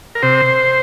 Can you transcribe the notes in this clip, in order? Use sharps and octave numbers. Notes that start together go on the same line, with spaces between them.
A#4
C3 C5